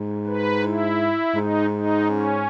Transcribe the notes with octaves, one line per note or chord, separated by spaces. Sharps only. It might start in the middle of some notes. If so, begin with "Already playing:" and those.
Already playing: G#2
B4
E4
G#2 D#4
D#4
C#4